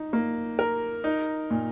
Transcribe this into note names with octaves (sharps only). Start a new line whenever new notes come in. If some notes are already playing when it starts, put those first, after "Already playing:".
Already playing: D#4
A#3
A#4
D#4
A#2